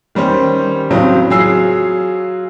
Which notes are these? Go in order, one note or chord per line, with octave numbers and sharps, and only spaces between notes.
D#3 G3 C#4 C5
A2 C#3 F#3 C4
F#3 F4 G#4 E6 C7